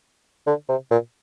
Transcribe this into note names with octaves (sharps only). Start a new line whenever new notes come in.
D3
C3
A#2